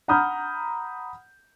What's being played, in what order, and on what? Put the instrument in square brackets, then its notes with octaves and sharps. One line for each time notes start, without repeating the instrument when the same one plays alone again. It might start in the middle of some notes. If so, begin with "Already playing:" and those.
[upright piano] F#5 A#5 B5 D#6 F6 G6